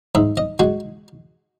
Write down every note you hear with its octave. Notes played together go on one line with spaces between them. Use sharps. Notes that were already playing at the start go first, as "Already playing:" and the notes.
G#2 E5
D#5
G#3 F#4